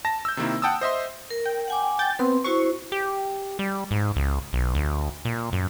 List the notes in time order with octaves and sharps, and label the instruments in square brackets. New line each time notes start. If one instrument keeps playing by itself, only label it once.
[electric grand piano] A5 A#6
E6 G6
C3 D#3 A#3 E4
F#5 G5 A5 D#6 E6
C5 D#5 E5 C6
[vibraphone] A#4
[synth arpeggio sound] G5
[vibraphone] F#5 G#5 D6
[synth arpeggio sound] G5 G6 A6
[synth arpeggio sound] B3 C4 [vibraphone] C6
[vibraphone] E4 F#4 C5 [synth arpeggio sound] C#6
[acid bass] G4
G3
G#2
C#2
B1
D2
A#2
F#2